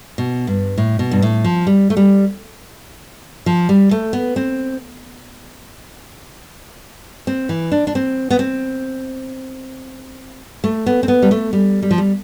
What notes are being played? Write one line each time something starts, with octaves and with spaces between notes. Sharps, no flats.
B2
G2
A2
B2
G2
A2
F3
G3
A3
G3
F3
G3
A3
B3
C4
C4
E3
D4
D4
C4
B3
C4
A3
B3
C4
B3
G3
A3
G3
G3
F3
G3